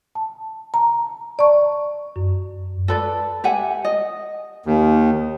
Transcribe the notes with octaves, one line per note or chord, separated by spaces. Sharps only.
A5
A5 A#5
D5 A5 C#6
F#2
A4 B4 D5
G4 E5 F#5 G#5
D#5
D#2